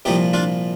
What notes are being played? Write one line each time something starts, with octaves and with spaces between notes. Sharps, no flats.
C2 A#2 F3 D#4 G4
D4 F4